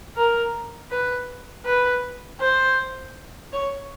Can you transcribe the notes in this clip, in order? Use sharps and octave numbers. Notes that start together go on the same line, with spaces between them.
A#4
B4
B4
C5
C#5